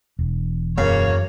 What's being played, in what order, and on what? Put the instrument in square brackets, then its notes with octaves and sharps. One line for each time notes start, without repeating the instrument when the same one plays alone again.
[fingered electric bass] E1
[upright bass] F#2 [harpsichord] C#3 [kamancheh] A#3 C#5